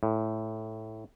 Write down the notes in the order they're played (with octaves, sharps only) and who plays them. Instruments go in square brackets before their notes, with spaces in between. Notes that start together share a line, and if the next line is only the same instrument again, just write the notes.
[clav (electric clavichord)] A2